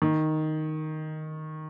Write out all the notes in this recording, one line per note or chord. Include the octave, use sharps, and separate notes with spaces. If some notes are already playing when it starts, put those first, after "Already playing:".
D#3